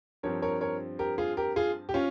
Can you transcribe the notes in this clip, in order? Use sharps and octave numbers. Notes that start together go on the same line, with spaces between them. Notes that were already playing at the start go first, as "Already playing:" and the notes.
G2 F3 C4 A#4 C#5
A#4 C#5
A#4 C#5
G4 A#4
F4 G#4
G4 A#4
F4 G#4
G4
C#4 F4